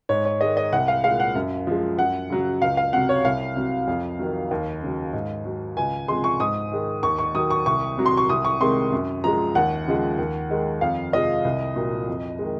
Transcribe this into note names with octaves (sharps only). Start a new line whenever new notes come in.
G#2 C#5
C#5
D#3 G#3 D#5
D#5
C2 F#5
F5
A#2 G#3 F5
F#5
F#2
F3 G#3
F#2 F#5
C#3 F#3
C#2 F5
F5
C3 F#3 F#5
C#5
C2 F5
C3 F#3
F2
D#3 F#3
D#2
C#3 F#3
G#2
F#3
C#2 G#5
C3 F3 G#3 C6
C#6
G#2 D#6
D#3 G#3
D#2 C#6
C#6
D#3 F#3 D#6
C#6
C2 C#6
C3 F#3
C6
C#6
C2 D#6
C#6
C3 D#3 G#3 C6
F#2
F3 G#3 A#5
D#2 F#5
C#3 F3 G#3
D#2
D#3 G#3
F2 F5
C3 F3 G#3 D#5
C2
A#2 F#3
F2
D#3 G#3